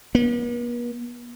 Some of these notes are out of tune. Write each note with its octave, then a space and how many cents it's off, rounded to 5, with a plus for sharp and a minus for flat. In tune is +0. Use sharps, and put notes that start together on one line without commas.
B3 -45